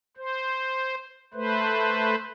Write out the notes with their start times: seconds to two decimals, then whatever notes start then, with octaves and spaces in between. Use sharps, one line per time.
0.17 C5
1.34 A3 B4 C5